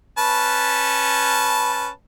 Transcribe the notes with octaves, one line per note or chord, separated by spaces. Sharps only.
C#4 B4 A5